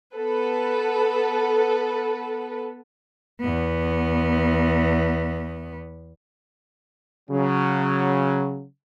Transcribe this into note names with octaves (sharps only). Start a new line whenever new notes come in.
B3 A4 B4
E2 B3
C#3 F#3